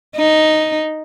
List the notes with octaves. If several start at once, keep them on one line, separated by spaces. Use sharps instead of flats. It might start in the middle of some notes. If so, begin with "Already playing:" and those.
D#4